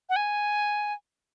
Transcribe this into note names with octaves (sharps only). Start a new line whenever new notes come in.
F#5
G#5